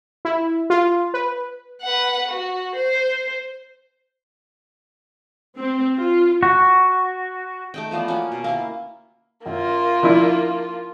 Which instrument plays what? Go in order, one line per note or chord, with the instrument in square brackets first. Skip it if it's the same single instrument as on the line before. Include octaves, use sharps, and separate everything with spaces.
[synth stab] E4
F4
B4
[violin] B4 F#5
F#4
C5
[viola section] C4
F4
[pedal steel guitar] F#4
[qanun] A3 D#4 G5
E3 F3 B3 D5
A#3 C#4 F#4
B2
A#3 E4
[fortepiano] F#2 [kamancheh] A#3 F4
[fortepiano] F3 D4 E4